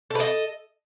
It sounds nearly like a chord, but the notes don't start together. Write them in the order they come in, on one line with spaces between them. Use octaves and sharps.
A4 B4 D#5